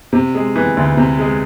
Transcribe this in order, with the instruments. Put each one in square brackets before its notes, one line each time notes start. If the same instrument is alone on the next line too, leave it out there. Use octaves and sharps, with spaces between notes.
[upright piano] C3
G#3
E3
D2
C3
G#3